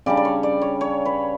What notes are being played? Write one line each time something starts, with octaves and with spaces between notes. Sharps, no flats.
C#3 G3 D4 D5
D5
C#5
D5
C#5
C#5
B4